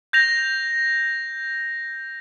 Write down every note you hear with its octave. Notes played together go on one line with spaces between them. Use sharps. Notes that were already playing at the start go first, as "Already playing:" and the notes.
G6 A#6 F7